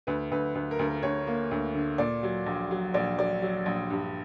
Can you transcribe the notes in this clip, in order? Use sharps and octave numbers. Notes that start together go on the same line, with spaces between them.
D2 B4
D2 B4
D2 B4
A#4
D2
A#4
D2 C#5
A#3
D2
D3
A#2 D5
F#3
A#1
F#3
A#1 D5
F#3 D5
F#3
A#1
G2